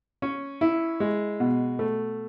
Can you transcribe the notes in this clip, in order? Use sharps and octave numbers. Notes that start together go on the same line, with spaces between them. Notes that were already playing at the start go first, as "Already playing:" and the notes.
C#4
E4
G#3
B2
A3